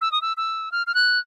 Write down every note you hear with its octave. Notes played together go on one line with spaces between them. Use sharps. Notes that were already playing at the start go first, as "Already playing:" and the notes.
E6
D#6
E6
E6
F6
F6
F#6